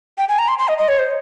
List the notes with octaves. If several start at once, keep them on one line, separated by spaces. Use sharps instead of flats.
G5
G#5
A#5
C6
C6
D#5
D#5
C#5
C5